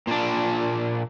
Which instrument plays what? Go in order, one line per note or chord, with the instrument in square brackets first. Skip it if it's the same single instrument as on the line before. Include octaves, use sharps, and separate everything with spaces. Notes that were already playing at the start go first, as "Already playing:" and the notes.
[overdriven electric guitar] A#2 D4